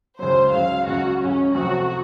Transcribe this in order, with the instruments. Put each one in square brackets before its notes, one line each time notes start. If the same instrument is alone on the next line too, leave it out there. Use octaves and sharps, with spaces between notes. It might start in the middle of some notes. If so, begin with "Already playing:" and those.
[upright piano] C#2 C#3 F#3 [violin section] C5
[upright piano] C#2 C#3 F#3 [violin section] F5
[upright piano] C#2 C#3 F#3 [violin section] F#4
[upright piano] C#2 C#3 F#3 [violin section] C#4
[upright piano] F2 C3 F#3 A3 C4 [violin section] F#4